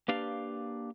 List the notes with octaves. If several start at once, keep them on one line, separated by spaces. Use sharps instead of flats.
A#3 D4 G4 B4 D5 F5